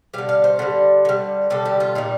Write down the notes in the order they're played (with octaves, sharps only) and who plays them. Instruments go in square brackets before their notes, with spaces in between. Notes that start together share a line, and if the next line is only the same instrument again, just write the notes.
[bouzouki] D3 G3 F5
F5
C5
D3 G3
D3 G3
D3 G3 A4
G4
F4
A#2 G3 D#4